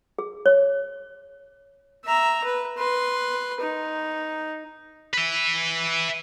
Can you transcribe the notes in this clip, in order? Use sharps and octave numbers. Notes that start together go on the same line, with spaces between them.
G#4
C#5
E5 A#5
B4
B4 C6
D#4
B4 E5